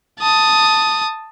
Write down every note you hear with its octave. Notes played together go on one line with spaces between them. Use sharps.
A5 D#6